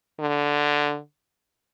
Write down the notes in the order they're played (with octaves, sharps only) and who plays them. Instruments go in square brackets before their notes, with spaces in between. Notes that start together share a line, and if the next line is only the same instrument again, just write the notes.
[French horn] D3